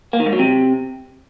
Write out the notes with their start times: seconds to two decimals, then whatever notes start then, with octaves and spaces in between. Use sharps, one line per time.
0.13 A#3
0.20 D#3
0.26 G#2
0.33 F#3
0.39 C3